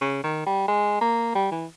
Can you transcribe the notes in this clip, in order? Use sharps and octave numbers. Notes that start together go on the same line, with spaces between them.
C#3
D#3
G3
G#3
A#3
G3
E3